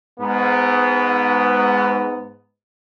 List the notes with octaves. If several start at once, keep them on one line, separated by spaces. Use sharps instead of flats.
G#2 B3